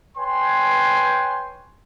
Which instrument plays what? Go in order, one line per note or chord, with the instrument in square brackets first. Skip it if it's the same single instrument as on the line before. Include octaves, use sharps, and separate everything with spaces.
[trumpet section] B4 C#5 G5 G#5 C6